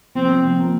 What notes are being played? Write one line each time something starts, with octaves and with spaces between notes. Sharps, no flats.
F3 C4
F3
F3
A#3